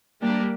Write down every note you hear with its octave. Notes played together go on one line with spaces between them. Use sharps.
G3 A#3 D4 G4 A#4